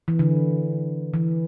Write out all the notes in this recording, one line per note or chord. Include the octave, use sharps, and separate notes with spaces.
E3
D3
E3